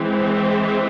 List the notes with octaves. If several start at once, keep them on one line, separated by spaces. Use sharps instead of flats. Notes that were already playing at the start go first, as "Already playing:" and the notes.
Already playing: E3 G#3 C4